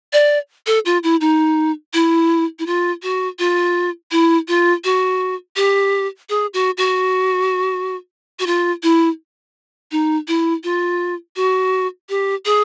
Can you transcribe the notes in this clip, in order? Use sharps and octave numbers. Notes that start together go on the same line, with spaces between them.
D5
A4
F4
E4
D#4
E4
E4
F4
F#4
F4
E4
F4
F#4
G4
G#4
F#4
F#4
F#4
F4
E4
D#4
E4
F4
F#4
G4
G#4